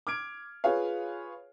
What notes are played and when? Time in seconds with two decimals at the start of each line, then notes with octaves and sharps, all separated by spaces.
0.07 D6 F6 G#6 D7
0.64 F4 G#4 B4 C#5 F5